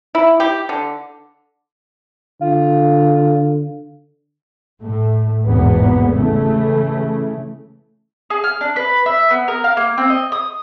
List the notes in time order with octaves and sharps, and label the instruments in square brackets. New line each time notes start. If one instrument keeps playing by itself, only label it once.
[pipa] E4
G4
D3
[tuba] D3 [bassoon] F4
[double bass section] A2 A3
G#1 E2 B2 A#3 B3
C#3 E3 A3
[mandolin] G#4
F6
D4
B4
E5
B3
A#4
F5
A#3
C4
D#5
D#6